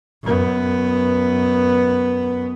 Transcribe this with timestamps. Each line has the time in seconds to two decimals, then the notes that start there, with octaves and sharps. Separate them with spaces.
0.23 F#2 B3